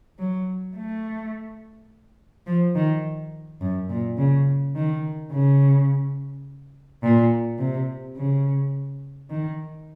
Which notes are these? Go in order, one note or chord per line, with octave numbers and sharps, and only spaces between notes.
F#3
A3
F3
D#3
F#2
A#2
C#3
D#3
C#3
A#2
C3
C#3
D#3